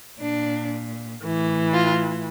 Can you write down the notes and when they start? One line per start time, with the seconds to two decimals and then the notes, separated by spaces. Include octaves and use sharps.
0.20 A#2 D4
1.22 A2 E3
1.73 F4